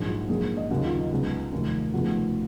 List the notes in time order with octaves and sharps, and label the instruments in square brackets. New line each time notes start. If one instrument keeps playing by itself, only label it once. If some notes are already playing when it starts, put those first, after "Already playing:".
Already playing: [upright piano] A#1 G#2 F#3 G#4
F#4
A#1 G#2 F#3 A#3 G#4
D#5
D#2 C#3 F#3 F#4
F4
D#4
C#2 C#3 F#3 B3
F1 D#2 D#3 F#3
F1 D#2 C#3 F3 B3 F#4